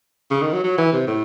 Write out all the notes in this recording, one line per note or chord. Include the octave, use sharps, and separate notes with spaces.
C#3
D#3
F#3
F#3
E3
C3
A2